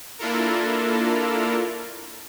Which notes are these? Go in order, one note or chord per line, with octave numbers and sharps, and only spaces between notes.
A#3 D4 E4 F4 A4 A#4